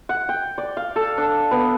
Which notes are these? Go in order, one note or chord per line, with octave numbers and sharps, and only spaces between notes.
F#5
G5
D5
F5
A4
D4
B3